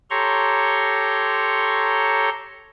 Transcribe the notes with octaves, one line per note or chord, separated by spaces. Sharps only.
G4 A4 C#5 A#5 C6 C#6